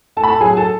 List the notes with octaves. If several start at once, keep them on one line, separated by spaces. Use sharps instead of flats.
A2 A4 A5
B5
A4 A5
F#3 G#4 G#5
A4 A5